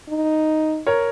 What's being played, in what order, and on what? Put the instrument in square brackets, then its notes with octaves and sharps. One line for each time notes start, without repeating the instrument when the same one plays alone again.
[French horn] D#4
[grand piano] A#4 C#5